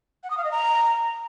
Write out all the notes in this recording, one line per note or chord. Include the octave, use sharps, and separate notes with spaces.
F#5
D#6
F5
D#5
A#5